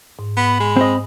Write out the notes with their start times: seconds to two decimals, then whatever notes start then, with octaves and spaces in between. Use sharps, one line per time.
0.19 G#2
0.37 B3 B5
0.60 G#3
0.76 C4 D#5